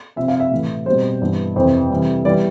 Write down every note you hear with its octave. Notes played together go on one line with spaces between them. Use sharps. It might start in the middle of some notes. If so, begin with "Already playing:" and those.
C3 F3 C4 E5
F5
E5
A2 E3 A3
B2 G3 C4 C5
G2 E3 B3
F2 C3 E3 C5
C3 E3 G3
E3 G3 B3 D5